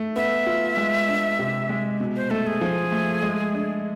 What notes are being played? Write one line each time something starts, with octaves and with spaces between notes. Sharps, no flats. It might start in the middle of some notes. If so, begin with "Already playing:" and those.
Already playing: A3
B3 E5
F4
G#3
D4
C3
G#3
B2
C5
A3 A4
G#4
F3
A3
G#3
D4